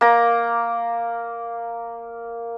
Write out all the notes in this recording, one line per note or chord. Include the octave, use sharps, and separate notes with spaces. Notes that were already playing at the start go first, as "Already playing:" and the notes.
A#3 A#5